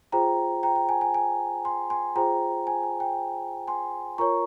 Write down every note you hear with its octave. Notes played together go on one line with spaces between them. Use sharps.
F4 G#4 C5 G5 A#5
G5 A#5
G5
G#5
G#5
G#5
G#5 C6
G#5 C6
F4 G#4 C5 G5 A#5
G#5
G#5
G5
G#5 C6
F4 A#4 C#5 A#5 C#6